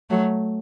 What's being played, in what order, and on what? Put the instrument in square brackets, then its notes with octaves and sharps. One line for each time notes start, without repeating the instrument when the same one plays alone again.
[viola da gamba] F#3 A3